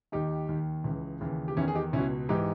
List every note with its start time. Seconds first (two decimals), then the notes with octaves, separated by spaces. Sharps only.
0.12 D#2 D#3 D#4 G4
0.49 D#2 D#3
0.84 C#2 C#3 E3
1.21 D#2 C#3 E3
1.48 G4
1.57 E2 D#3 C#4 E4
1.68 G#4
1.75 D#4 G4
1.93 C#2 B2 C#4 E4
2.29 G#2 E3 D#4 G4